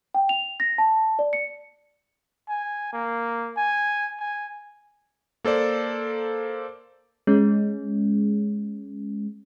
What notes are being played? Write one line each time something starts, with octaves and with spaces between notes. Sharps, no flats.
G5
F7
A#6
A5
D5
C#7
G#5
A#3
G#5
G#5
A#3 A4 C5 D5
G#3 C#4